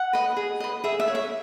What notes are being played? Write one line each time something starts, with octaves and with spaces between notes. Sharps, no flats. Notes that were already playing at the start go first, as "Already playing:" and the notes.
Already playing: F#5
B4 D#5
G#4
B4 D#5
G#4 E5
E5
C#5
E5